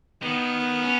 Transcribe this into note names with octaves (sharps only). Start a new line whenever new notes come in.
D#3 B3
C#4